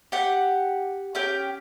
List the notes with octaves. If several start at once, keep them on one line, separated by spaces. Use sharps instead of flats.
G4 F#5
C#4 G4 G5